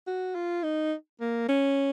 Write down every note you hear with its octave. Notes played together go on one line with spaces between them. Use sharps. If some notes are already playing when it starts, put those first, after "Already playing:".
F#4
F4
D#4
A#3
C#4